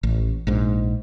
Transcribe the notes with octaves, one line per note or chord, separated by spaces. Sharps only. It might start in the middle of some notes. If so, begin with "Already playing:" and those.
A1
A#1 G#2